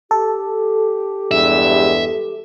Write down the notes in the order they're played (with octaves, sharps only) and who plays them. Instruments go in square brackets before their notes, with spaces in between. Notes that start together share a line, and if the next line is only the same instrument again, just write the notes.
[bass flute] G4 [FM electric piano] A4
[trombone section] E2 G2 G#3 [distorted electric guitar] E5